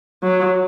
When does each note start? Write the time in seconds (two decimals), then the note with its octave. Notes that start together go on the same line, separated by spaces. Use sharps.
0.23 F#3